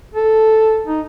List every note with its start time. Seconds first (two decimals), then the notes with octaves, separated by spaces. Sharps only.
0.15 A4
0.87 D#4